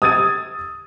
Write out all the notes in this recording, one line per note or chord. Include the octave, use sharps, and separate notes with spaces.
D#6 E6 G#6 A6 D#7